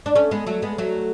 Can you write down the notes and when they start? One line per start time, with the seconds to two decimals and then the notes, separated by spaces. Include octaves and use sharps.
0.06 D4
0.15 A3 C#4
0.31 G#3 B3
0.47 F#3 A3
0.62 G#3 B3
0.78 F#3 A3